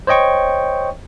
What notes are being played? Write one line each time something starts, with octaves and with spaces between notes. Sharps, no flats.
C5 C#5 D#5 G5 C#6